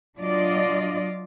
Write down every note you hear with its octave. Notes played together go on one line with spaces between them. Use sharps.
F#3 D4 F4 D5 D#5